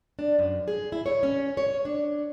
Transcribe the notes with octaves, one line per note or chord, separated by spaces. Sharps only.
D4
F#2
G#4
E4
C#5
C#4
C#5
D4